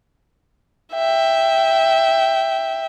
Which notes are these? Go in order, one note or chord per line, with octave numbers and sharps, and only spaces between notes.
E5 G5